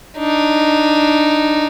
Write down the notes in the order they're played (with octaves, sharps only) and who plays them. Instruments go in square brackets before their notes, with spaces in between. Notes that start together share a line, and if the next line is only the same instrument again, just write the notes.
[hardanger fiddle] D4 D#4